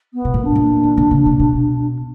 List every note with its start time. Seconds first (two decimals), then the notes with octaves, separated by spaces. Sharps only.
0.13 B3
0.25 B2
0.34 A#2
0.44 D4
0.55 A#2
0.83 D#3
0.97 D3
1.11 C#3
1.26 C3
1.39 B2